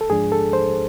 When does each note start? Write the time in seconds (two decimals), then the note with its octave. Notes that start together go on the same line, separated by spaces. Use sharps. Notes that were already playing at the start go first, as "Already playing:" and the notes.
0.01 A4
0.10 G#2 F3 G#3 D4 G#4
0.32 A4
0.53 C5